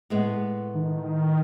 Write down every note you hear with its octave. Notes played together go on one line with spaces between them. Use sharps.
A2 G#3 B3
D#3